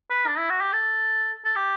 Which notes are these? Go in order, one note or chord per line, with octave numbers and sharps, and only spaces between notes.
B4
D4
E4
F#4
G4
A4
A4
G4